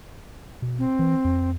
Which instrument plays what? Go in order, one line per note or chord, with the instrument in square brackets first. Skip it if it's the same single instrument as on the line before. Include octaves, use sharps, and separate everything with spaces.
[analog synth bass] B2
[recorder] C4
[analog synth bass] E3
F2